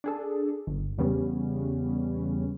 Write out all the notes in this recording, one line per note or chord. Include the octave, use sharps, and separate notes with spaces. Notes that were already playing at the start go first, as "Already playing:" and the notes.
D4 G#4 A4
G1
E2 C#3 G3 B3 C#4